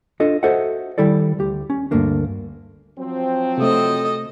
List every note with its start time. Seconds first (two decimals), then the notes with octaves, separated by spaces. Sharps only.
0.20 D4 F4 A4 D#5
0.43 F#4 A4 C5 D#5 E5 F#5
0.98 D#3 G3 E4 A4 D5
1.39 D2 G4
1.70 C#4
1.91 D2 G2 A3 A#3 D4
2.98 F3 F#3 C4
3.58 C3 A3 A4 D#5